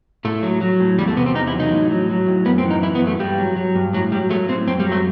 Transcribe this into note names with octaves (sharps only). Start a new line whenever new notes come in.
A2 A3
F#3
F#3
A2
E2 G3
A3
C3 B3
C4
E2 D#4
E4
F#3
D#4
A2
F#3
F#3
A2
F#2 B3
C4
E3
D#4
E3 E4
B3
F#2
A3
G2 G3
F#3
F#3
G2
A2 F#3
F#3 G3
F#3 A3
A2 C4
F#2 C4
G3
F#3
A3